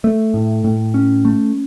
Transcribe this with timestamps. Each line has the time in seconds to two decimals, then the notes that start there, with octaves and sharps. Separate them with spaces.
0.04 A3
0.34 A2
0.64 A2
0.94 C#4
1.25 A3